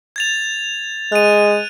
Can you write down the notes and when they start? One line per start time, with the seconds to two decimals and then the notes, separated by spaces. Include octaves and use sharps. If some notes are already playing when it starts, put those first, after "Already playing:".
0.16 G#6 A6 F7
1.12 G#3 F#6 D#7